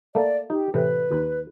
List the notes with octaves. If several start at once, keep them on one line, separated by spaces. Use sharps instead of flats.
A3 A#3 D5
D#4 G4
A2 C3 E3 B4
D#2